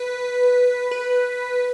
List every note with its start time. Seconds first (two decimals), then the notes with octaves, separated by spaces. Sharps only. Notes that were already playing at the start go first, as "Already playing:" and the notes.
Already playing: B4
0.91 B4